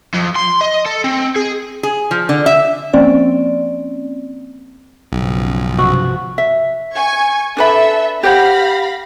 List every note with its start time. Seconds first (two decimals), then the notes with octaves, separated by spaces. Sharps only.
0.14 F2
0.36 C6
0.61 D#5
0.86 A4
1.04 C4
1.36 G#4
1.83 G#4
2.11 F3
2.29 D3
2.46 E5
2.93 F3 A#3 C4 C#4 D5
5.12 B1 G2 C#3 F3
5.78 C3 F#4
6.38 E5
6.94 G#5 C#6 G#6
7.57 D4 A4 B4 E5 B5
8.23 G4 C5 F5 F#5 B5 A#6